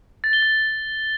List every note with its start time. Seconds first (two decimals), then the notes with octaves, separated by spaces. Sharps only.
0.24 A6
0.33 G7
0.43 A6